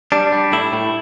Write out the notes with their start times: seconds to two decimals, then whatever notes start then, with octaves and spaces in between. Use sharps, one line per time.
0.12 G3 D4
0.32 G3
0.52 A2 E4
0.73 A2